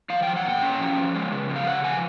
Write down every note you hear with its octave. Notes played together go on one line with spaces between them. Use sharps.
F3 F5
G5
F3
F#5
A#2 G5
C#4
F3
F3
G#3
C#3
F3
F5
C#3 F#5
F3 G#5